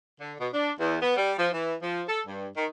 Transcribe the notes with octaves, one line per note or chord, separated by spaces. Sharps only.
D3
B2
D4
E2
B3
G3
F3
E3
F3
A4
G2
D#3